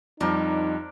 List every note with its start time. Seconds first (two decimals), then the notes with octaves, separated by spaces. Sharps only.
0.21 F2 G3 D4 D#4 A#4 C5